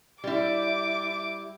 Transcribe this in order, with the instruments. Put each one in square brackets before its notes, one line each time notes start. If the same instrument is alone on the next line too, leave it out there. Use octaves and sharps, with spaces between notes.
[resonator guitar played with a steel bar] G3 E4 [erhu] D6